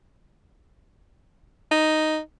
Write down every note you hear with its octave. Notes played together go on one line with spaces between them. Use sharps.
D#4